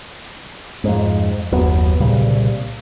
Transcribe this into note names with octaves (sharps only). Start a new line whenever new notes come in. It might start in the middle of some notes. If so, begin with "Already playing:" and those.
F2 G#2
F#1 D#2 F#3 B3
C2 A#2 C#3 G3